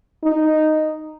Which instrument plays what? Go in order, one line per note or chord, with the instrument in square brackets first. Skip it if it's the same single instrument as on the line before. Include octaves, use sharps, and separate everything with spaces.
[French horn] D#4